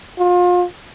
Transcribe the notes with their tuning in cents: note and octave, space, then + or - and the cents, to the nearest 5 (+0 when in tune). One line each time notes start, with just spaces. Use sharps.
F4 +35